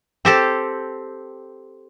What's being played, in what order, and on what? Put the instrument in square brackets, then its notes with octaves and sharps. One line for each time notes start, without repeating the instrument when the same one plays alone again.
[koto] C4 G4 A4